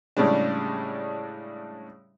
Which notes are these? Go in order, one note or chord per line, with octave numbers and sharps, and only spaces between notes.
A2 C#3 G3 G#3 D4